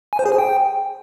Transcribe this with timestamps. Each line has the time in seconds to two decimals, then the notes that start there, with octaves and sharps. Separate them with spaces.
0.13 G#5
0.19 C5
0.26 G#4
0.32 G#5
0.38 G5